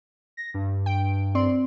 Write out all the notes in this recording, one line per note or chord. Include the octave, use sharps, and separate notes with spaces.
A#6
G2
G5 D7
C4 D5 C6